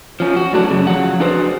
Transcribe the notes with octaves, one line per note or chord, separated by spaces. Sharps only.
F3 C#4
F#4
A2 F#3 D4
F#2 C#3
F3 F#3 F#5
D4 F#4 G#4 B4 C5